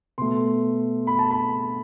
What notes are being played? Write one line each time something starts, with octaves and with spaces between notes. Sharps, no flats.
B2 A3 C6
B5
A5
B5